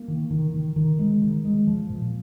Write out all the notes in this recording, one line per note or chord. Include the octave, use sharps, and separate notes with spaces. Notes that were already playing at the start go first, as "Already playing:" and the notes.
Already playing: A#3
D#3
D#3
D#3
D#3
G#3
D#3
G#3
F3
A#2